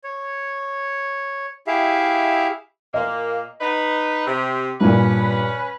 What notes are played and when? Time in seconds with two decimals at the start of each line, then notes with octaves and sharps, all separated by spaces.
0.04 C#5
1.67 E4 G4 G#4 E5 F5
2.94 A#2 A#3 D#5
3.61 D#4 B4
4.27 C3
4.81 G2 A#2 C#4 B4